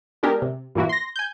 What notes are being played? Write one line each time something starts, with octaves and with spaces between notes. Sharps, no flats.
G#3 B3 D4 G4 G#4 A#4
C3
G2 A#2 E3 A#3 E4 F#4
C6 A#6
G#5 G6